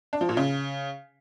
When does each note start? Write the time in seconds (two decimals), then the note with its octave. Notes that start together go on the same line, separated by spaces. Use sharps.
0.13 D4
0.21 F3
0.29 A#2
0.37 C#3